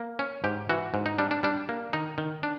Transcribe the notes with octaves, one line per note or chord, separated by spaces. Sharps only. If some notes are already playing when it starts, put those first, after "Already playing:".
Already playing: A#3
C#4
G#2 G4
E3 F#4
G#2
D#4
G3 D4
D4
G3 D4
A#3
D#3 D#4
D#3
D4